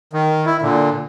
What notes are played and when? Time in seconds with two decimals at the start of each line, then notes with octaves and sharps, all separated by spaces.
0.13 D#3
0.46 E4
0.62 A#2 D3